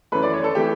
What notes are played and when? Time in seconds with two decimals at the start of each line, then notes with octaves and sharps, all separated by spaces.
0.12 F#2 E3 A3 B4
0.22 D5
0.34 C#5
0.44 A4
0.55 E3 A3 G4